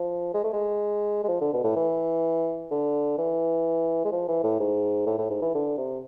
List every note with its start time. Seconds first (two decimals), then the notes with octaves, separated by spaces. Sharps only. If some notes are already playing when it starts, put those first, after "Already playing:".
Already playing: F3
0.34 G#3
0.44 A3
0.53 G#3
1.24 G#3
1.29 F3
1.41 D3
1.53 B2
1.64 A2
1.76 E3
2.71 D3
3.18 E3
4.05 G#3
4.12 F3
4.28 E3
4.44 A2
4.60 G#2
5.06 A2
5.18 A2
5.30 G#2
5.42 E3
5.55 D3
5.78 C3